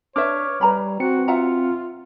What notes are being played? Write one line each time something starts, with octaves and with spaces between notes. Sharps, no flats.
D4 B4 C#5 E5 D6 F6
G3 B4 A#5 B5
C4 F#4 C#7
F4 E5 F#5 A#5